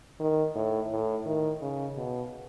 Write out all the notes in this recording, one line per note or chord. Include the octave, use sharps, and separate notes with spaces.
D#3
A2
A2
D#3
C#3
B2